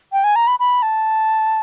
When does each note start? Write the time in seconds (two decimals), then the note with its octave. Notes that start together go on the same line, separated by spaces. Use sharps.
0.13 G5
0.24 G#5
0.36 A#5
0.47 B5
0.60 B5
0.82 A5